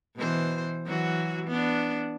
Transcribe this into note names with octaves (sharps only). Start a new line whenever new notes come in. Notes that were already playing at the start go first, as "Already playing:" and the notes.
B2 E3 C5
E3 F#3 F#4
B3 D4